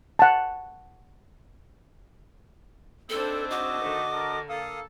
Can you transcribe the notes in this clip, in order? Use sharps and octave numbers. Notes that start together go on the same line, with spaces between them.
F#5 A5
G#2 C4 D4 E4 A4 C5 E6
F#4 D#5 D6
D3 D#3 A3
A4 A#4
A#3 A4 F5 D#6